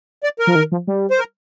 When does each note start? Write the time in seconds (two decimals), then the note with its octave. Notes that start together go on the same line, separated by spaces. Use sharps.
0.24 D5
0.39 A#4
0.47 F3
0.55 D#3
0.72 F3
0.87 G3
1.11 C5
1.19 A#4